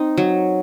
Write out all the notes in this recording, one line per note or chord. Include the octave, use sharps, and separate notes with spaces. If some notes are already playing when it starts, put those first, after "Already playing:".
Already playing: C4 D#4
F#3